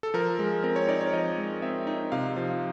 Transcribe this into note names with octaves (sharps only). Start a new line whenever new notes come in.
A4
F3 A#4
G#3
C4 A#4
C#5
D#4 D5
C#5
F3 D#5
G#3
C4 E5
D#4
C3 F5
F3